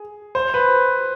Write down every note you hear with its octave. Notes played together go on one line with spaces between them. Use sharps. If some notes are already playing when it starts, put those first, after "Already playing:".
Already playing: G#4
C5
B4